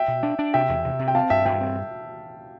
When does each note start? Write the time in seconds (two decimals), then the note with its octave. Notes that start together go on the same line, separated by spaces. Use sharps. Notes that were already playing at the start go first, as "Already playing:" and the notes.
Already playing: E5 G5
0.08 B2
0.23 D4
0.39 D4
0.54 C3 E5 G5
0.69 E2
0.85 C3
0.99 C3
1.08 G5
1.15 C4 F5 A5
1.30 G2 E5 G5
1.45 G2 E5 G5
1.61 C4